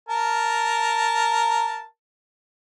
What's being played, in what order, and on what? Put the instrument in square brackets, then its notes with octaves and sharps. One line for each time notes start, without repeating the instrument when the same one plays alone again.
[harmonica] A#4 A5